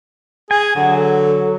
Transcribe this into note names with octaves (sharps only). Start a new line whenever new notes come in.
G#4 G#5
D3 F#3 F#5
A4